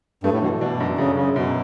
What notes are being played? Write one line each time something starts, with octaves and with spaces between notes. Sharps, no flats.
G2 A3
A2
B2 E3
B2 D4
F#2
F#2 C#3
F#2 C#3
F#2 B2